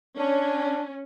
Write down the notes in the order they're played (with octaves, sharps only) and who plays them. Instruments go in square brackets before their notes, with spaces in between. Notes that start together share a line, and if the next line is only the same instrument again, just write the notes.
[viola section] C#4 [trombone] D4